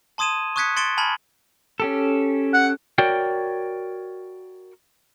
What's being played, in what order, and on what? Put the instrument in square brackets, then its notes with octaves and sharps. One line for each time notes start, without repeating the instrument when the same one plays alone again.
[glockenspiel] A5 C6 D#6 G#6 D#7 E7
C#6 D#6 F#6 G#6 B6 C#7
C6 A6 C#7 D7 E7 G7
G#5 A5 B5 F6 G#6 F#7
[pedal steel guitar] C#4 G4 A4
[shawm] F#5
[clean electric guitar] F#4 A#4 C#5 D5 G5